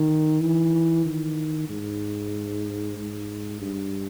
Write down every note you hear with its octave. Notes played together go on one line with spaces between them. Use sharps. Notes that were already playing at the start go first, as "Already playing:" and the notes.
Already playing: D#3
E3
D#3
G#2
G#2
G2